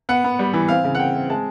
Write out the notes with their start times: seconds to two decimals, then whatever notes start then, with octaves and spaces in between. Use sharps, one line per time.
0.09 B3 F#5
0.24 B3
0.39 G3
0.54 E3
0.68 C4 F5
0.84 C#3
0.95 F#5
0.99 C4 G5
1.15 C4
1.30 G#3 A5